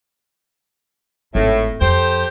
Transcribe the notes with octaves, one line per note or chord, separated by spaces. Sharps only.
G#1 A2
F2 G4 A4 C5